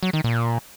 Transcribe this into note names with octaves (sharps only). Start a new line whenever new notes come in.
F#3
D#3
A#2